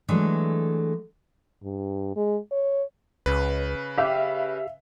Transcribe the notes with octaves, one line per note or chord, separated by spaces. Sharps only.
E3 F#3 G#3 A3 D4 A4
G2
G#3
C#5
C#2 C#3 B4
G4 E5 F5